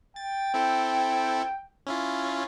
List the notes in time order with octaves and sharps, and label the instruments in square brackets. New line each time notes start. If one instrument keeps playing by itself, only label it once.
[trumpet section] G5 [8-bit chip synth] A6
[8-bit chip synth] C4 E4 A4
C#4 E4 F4